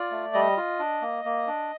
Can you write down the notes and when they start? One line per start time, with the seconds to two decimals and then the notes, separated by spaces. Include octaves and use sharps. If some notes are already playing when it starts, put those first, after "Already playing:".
Already playing: F4 D5
0.11 A3
0.34 G3 D#5
0.57 F4
0.79 D4
1.02 A#3
1.25 A#3
1.47 D4